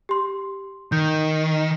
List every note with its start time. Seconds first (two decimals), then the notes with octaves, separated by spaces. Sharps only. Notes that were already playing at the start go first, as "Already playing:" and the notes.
0.09 G4 C6
0.92 D#3 G6